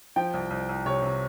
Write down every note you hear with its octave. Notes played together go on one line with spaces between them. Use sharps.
F3 G5
C2
C2
C2
C3 C#5
C3